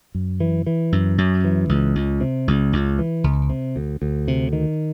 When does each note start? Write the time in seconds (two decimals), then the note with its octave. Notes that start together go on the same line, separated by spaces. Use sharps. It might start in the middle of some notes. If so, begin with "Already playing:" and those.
0.15 F#2
0.40 E3
0.66 E3
0.92 F#2
1.18 F#2
1.44 E3
1.69 C#2
1.95 C#2
2.21 C3
2.48 C#2
2.73 C#2
2.99 E3
3.24 C#2
3.49 C3
3.76 D2
4.02 D2
4.28 C3
4.53 D#3